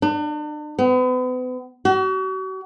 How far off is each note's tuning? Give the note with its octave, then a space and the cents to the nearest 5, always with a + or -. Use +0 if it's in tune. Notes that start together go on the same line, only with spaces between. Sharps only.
D4 +40
B3 +40
F#4 +40